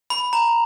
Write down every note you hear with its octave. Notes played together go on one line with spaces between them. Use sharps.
B5
A#5